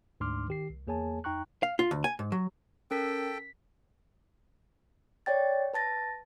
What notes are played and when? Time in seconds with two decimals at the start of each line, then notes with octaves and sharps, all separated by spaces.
0.20 D2 G#2 D4 C6 D6 F6
0.48 D#3 G4 C7
0.70 C2
0.87 E2 A#3 G#4 C#5 G#5 A5
1.24 F2 D#4 G5 A#5 C#6 F#6
1.63 F5
1.79 F4
1.91 D2
2.04 G#5
2.19 G#2
2.32 F#3
2.91 C#4 A4 A#4 G5 B6
3.31 B6
5.26 C#5 D5 G5 A6
5.74 B4 A5 A6 A#6